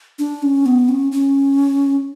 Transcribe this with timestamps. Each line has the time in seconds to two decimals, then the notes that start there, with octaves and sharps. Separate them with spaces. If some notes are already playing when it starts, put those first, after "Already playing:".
0.19 D4
0.43 C#4
0.66 B3
0.89 C#4
1.12 C#4